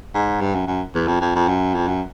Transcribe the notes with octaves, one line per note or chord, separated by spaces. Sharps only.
G#2
G2
F#2
F#2
E2
F2
F2
F2
F#2
F2
F#2